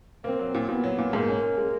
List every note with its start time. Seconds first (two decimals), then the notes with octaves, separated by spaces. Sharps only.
0.24 A#3 C4
0.39 F#3
0.54 A#2
0.68 A#2 B3
0.84 F#3
0.98 A#2
1.13 G#2 A#3
1.28 C#4
1.43 C#4
1.58 G#3